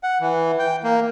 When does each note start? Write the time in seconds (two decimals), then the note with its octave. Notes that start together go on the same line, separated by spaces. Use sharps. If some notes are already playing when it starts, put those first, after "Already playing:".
0.03 F#5
0.21 E3
0.59 G5
0.83 A#3